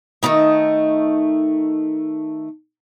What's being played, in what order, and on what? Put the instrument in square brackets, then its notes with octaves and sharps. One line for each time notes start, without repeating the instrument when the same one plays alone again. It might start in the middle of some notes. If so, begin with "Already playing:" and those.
[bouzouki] D#3 A3 B3 D#4